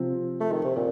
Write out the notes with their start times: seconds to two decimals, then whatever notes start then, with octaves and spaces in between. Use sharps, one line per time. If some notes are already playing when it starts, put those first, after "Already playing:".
Already playing: C3 F3 C4
0.40 A3
0.52 D#3
0.65 C3
0.76 A#2 C4